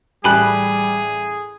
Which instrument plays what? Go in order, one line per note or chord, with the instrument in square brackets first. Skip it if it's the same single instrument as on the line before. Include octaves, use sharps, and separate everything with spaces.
[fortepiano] A1 G4 A5 [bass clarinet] G3 [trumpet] G#4 [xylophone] G#5 B5 F#6